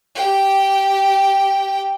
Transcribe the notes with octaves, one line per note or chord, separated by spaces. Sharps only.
G4 G5